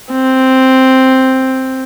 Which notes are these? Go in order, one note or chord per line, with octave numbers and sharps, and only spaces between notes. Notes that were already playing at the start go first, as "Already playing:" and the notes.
C4